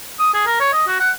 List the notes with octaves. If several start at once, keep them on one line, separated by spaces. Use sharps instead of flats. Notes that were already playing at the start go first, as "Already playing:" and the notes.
D#6
G#4
A#4
C#5
D#5
F#4
F#5